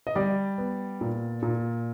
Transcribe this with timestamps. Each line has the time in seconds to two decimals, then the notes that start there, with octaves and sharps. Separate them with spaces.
0.07 D#5
0.15 G3 D5
0.58 B3
1.01 A#2
1.42 A#2